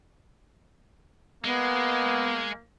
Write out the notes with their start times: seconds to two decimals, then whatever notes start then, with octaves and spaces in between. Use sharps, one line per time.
1.44 G#3 A#3 B3